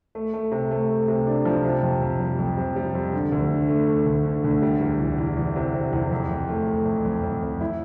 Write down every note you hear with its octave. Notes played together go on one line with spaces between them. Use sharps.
A3
A3
C3
A3
A3
C3
D4
F3
C3
F2
F2
G3
F2
C3
G3
F2
D3
D2
D3
A3
A3
D2
D3
D2
G3
E2
E2
E2
E2
C3
C3
E2
F2
F2
A3
A3
F2
F2
F2
F2
E4